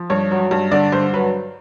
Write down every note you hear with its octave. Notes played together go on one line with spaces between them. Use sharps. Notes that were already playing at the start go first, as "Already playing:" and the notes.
Already playing: F3
G2 C#5
F#3
G2
D3 D5
G2 C5
F#3 B4